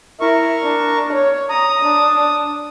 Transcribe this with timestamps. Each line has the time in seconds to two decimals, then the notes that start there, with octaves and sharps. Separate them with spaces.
0.21 E4 A#4 C#6
0.63 D4
1.12 C#5
1.49 A#5 D#6
1.82 D4